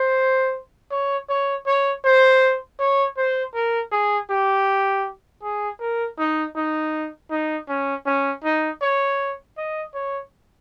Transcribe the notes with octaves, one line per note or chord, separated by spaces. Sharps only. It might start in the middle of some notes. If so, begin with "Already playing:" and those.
Already playing: C5
C#5
C#5
C#5
C5
C#5
C5
A#4
G#4
G4
G#4
A#4
D#4
D#4
D#4
C#4
C#4
D#4
C#5
D#5
C#5